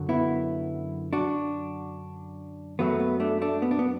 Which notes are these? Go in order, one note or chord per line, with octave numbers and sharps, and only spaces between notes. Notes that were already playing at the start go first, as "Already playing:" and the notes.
Already playing: F#2 D3 F#3
B3 E4
D4 F#4
F#2 F#3 A3 B3
B3
A3 D4
A3 D4
B3
D4
B3